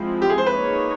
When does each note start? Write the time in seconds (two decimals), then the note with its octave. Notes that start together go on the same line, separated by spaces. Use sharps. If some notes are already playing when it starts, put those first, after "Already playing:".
Already playing: F3 G#3 C4 E4
0.22 G4
0.30 G#4
0.38 C5
0.46 B4
0.55 A#3 D#4 G#4 C#5